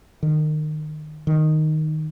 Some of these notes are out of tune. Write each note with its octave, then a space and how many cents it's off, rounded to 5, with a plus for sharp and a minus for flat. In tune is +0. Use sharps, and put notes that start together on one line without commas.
D#3 -25
D#3 -5